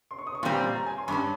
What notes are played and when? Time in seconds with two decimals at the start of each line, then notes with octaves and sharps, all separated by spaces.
0.11 C6
0.18 C#6
0.27 D#6
0.35 C#6
0.43 A#2 G3 C4 C6
0.75 A#5
0.86 G#5
0.98 C6
1.08 G2 G3 C#4 C#6